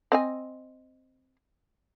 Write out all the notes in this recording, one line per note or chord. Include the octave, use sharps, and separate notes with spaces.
C4 D#5 G#5